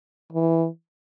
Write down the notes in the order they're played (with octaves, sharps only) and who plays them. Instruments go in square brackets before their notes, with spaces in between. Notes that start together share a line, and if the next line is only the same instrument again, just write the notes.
[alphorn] E3